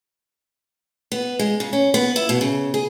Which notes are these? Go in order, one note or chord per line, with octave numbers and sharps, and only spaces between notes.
B3
G#3
C#3
C#4
B3
E4
B2
C#3
G#4